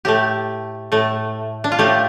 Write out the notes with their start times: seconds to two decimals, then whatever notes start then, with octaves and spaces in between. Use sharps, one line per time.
0.05 A2 A3 G4
0.92 A2 A3
1.64 D4
1.72 F4
1.79 A2 A3 G4